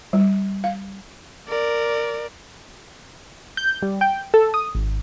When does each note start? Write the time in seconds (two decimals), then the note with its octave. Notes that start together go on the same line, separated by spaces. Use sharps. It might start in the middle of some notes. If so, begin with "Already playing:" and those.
0.13 G3
0.64 F5
1.48 A#4 D5
3.57 G6
3.82 G3
4.01 G5
4.34 A4
4.54 D#6
4.75 G#1